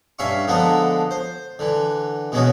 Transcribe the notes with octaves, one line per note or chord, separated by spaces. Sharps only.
G2 C#4 E5 F5 C#6
D3 F3 G#3 B3 A4 A#5
C5
D3 E3
B2 E3 G#3 B3 C#4 F#4